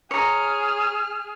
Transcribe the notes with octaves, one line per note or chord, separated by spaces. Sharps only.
G#4 C#5 A#5 F6